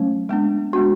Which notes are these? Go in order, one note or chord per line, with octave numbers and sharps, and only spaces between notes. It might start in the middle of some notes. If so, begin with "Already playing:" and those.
Already playing: F#3 A3 C#4
G#3 B3 D4
G#3 B3 D4 F#4